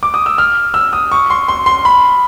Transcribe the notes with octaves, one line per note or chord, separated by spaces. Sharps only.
D6
D#6
E6
F6
E6
D#6
C#6
C6
C6
C6
B5